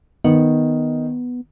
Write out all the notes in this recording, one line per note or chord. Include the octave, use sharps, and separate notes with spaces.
D#3 B3